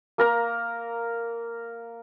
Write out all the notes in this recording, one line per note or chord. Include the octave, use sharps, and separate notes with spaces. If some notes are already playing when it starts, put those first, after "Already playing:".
A#3 A#4 A#5